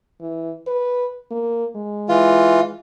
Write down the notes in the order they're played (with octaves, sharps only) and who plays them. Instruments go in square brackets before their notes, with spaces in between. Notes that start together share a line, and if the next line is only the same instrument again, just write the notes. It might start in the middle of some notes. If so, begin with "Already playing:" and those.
[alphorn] E3
B4
A#3
G#3
[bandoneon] E3 F4